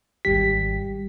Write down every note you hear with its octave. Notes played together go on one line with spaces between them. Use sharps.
G#1 G3 G4 B6